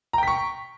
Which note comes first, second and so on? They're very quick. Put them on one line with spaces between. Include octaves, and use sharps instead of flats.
A#5 G5 B6 C#6